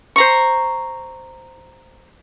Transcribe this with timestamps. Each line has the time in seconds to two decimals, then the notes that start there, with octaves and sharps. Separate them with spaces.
0.16 C5 A#5 C#6